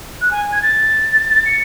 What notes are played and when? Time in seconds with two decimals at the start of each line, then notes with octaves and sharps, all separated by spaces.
0.21 F#6
0.31 G#5
0.52 G#6
0.62 A6
1.46 C#7